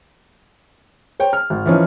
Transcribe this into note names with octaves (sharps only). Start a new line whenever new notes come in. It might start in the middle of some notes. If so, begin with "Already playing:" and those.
C5 C#5 G5
F6
G#1
E3 F3 C#4 D#4